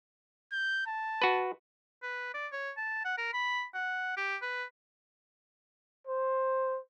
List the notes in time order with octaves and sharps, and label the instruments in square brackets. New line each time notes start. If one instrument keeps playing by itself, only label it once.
[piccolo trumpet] G6
A5
[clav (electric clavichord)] F#4 B4
[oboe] B4
D5
C#5
A5
F#5
A#4
B5
F#5
G4
B4
[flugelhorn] C5